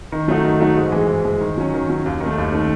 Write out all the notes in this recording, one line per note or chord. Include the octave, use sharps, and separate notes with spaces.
D#3
F#3 A3 D#4 F#4
D#3
F#3 A3 D#4 F#4
G#2
E3 G#3
G#2
E3 G#3
D#3
F#3 C#4
D#3
F#3 C#4
D#2
D#3
A3
D#2
D#3 A3